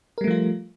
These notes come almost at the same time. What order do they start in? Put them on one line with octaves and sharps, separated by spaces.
A#4 G3 A3 F3 F4